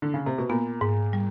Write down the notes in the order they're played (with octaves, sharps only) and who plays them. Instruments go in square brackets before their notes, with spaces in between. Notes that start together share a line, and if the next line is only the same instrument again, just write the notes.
[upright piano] D3
C#3
C3
B2
[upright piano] A#2 [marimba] B3
[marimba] G#2
G3